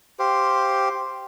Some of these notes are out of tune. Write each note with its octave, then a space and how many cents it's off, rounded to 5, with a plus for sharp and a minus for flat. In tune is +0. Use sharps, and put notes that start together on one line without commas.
G4 +0 C5 +0 F5 -10